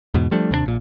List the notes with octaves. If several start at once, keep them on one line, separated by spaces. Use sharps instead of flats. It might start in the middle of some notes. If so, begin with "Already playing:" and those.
E2 G#2 B2
F3 G3 A3 D4
D#2 C3 G#3 D4
A#1 A#2